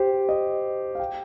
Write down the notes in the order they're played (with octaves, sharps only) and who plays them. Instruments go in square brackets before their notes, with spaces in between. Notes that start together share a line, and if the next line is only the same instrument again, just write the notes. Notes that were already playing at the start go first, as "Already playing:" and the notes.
Already playing: [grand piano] G4 C5
D#5
F5
G5